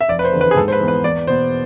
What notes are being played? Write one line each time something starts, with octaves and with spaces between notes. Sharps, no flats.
E5
F1 D5
B4
C5
E2 D3
B4
G#4
G#2 A4
C5
B4
E3 B3
B4
E2 D5
B2 B3 C5